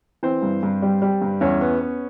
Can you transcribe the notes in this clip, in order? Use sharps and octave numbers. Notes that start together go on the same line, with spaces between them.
E3 C4 C5
G2
G2
G3
G3
G2
E2 C#4 C#5
B3
B3